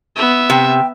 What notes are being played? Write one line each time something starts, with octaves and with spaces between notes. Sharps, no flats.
B3 E5
C3 G5